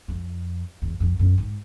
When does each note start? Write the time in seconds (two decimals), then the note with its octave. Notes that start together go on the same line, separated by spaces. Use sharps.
0.08 F2
0.82 E2
1.00 F2
1.19 F#2
1.38 G#2